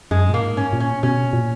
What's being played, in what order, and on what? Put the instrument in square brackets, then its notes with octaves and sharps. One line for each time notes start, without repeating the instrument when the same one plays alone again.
[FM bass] F#2 [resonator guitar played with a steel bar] G#3
[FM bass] A#2 [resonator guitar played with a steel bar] A#3
[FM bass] G#2
[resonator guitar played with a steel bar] C#4
[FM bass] A#2
[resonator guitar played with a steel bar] C#4
[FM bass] B2 [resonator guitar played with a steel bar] C#4
[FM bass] A#2